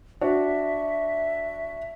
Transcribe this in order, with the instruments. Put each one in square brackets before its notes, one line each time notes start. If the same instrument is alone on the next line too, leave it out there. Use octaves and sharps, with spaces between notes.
[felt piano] D4 F#4 [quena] E5